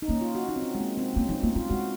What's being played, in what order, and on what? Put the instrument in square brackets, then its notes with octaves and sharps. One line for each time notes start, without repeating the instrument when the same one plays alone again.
[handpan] D#4
[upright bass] A#3 [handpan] C#4
[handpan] F4
F#4
D#4
C4
C#4
G#3
A#3
C4
[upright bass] A#3 [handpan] C#4
[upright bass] F3 [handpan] D#4
[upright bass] A#3 [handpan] F4
[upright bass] G#3 [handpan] F4
[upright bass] G#3 [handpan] F#4